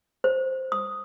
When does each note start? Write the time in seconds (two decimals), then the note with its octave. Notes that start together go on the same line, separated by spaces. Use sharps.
0.24 C5
0.72 D#6